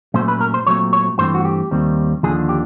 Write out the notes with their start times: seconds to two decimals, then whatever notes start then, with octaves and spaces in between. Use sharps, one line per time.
0.14 A#2 F#3 A3 C#4 C5
0.28 B4
0.41 A#4
0.54 C5
0.67 A#2 F#3 A3 C4 C#5
0.93 C#5
1.18 G2 E3 A3 C4 C5
1.35 F#4
1.45 G4
1.71 D#2 D#3 G3 C4
2.23 D#2 D3 F3 G#4
2.49 G4